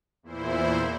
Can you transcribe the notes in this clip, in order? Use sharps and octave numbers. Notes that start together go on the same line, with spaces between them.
E2 A#2 E4 C5